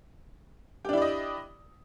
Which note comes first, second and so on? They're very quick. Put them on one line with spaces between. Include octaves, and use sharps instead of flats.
G4 D4 E4 D5 D#5